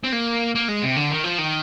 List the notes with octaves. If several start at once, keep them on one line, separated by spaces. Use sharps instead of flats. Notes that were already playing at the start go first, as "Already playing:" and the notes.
C4
A#3
A#3
G#3
C3
D3
D#3
F3
D#3